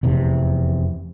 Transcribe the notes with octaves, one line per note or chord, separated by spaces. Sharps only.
F1 E2 C3